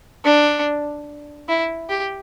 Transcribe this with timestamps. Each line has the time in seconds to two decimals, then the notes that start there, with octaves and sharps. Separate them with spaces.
0.25 D4
1.49 E4
1.90 G4